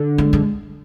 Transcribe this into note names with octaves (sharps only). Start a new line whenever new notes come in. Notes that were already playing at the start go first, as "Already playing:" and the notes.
Already playing: D3
G#3
G#3